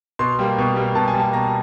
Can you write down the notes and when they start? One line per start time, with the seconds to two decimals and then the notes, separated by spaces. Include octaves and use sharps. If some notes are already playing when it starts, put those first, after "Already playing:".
0.19 B2 C6
0.39 G3 A#3
0.58 B2
0.76 G3 A#3
0.95 B2 A5
1.08 G#5
1.14 G3 A#3 A5
1.33 B2 A#5